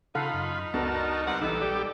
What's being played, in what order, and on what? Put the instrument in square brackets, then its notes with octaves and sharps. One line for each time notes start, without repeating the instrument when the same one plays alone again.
[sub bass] C#3 [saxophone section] D#4 [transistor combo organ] F4 B5 [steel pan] A4 F5 F#5
[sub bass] F#2
[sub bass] C#2 [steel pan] B3 D4 A4 [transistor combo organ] F#4 A#4 A5
[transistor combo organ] G3 C4 A#4 [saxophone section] E4 B4 F#5
[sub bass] A#1 [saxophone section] D#3 B3 A4 [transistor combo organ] E3 G3 [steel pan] D#4
[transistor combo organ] G3 G4 [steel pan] D5